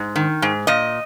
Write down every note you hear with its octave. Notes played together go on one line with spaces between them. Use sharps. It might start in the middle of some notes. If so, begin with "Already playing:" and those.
Already playing: G#2
D#3
G#2
A#2 D#5